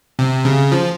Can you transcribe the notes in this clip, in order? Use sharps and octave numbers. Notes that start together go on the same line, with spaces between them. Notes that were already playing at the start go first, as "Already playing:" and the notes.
C3
C#3
F3